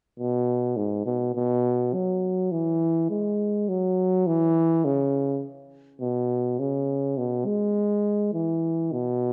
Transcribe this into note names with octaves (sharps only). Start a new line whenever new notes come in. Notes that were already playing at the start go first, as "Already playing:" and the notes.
B2
G#2
B2
B2
F#3
E3
G#3
F#3
E3
C#3
B2
C#3
B2
G#3
E3
B2